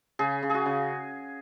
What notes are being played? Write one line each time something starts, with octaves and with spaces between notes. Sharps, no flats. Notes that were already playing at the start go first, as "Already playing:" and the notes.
C#3 G#4
C#3
F#4 G#4
C#3